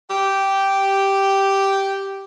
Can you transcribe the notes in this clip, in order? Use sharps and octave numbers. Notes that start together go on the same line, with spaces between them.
G4 G5